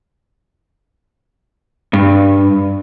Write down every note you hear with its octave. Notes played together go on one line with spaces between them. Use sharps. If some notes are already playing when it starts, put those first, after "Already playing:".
G2